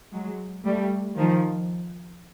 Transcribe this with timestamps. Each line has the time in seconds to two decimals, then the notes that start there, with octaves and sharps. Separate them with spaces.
0.12 F#3 G#3
0.64 G3 A3
1.16 D#3 F3